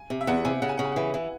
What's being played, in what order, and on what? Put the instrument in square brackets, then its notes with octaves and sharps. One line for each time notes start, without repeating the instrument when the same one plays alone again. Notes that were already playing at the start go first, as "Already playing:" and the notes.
Already playing: [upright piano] G#5
[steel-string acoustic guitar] C3
[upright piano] E5
[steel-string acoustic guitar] E2 [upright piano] F#5
[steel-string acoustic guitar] C3 [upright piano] G#5
[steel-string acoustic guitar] C#3 [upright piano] F#5
[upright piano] G#5
[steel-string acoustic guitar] C#3 [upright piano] F#5
[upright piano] G#5
[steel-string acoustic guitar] E3 [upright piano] F#5
[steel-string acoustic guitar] E3